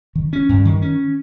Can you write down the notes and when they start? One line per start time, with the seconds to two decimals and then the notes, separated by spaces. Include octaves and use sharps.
0.15 D#3
0.33 C#4
0.49 G2
0.65 D#3
0.82 C#4